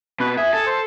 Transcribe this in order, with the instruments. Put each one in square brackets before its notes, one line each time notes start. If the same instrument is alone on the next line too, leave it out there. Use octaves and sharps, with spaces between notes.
[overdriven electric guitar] B2 [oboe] B4
[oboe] G#4 [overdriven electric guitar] E5
[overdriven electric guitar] A4
[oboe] C5